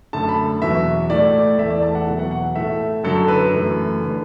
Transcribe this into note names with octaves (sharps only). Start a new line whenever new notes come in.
F#2 D3 A3 A5
B5
E2 B2 F#3 E5
A2 A3 D5
E2 E3 A3 E5
D5
A5
F#5
E2 B2 F#3 E5
F#5
F#5
A2 A3 E5
F#2 D3 F#3 A4
B4
F#2 E3 A3
D3 A3